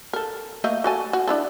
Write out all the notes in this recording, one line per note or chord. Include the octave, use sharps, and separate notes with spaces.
A4 A#4
A3 A#3 D#5
F#4 A4 G#5
F#4
D4 E4 A4